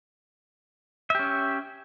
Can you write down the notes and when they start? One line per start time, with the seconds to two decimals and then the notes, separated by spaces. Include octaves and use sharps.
1.10 E5
1.15 G4
1.19 C#4